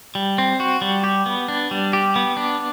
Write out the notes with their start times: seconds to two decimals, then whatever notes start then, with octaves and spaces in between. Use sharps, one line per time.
0.15 G3
0.38 C4
0.60 F#4
0.82 G3
1.04 G4
1.26 B3
1.48 D4
1.71 G3
1.93 G4
2.16 B3
2.37 D4